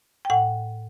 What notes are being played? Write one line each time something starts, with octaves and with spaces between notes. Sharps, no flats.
G5
A2 F#5